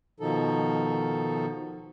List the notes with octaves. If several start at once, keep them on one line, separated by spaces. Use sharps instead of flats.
B2 D#3 F3 D#4 A4